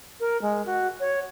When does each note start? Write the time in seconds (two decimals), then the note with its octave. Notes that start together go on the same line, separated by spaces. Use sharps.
0.20 A#4
0.42 G#3
0.66 F#4
1.00 C#5